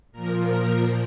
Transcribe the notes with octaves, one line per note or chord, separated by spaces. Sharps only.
A#2 F3 A#4
A#4